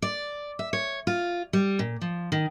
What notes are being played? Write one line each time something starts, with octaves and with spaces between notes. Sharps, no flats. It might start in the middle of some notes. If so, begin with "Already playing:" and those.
D5
E5
C#5
F4
G3
A#2
F3
D#3